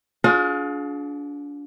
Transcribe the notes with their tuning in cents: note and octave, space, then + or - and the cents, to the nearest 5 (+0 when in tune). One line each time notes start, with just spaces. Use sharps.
D4 -30 F4 +35 G#4 +30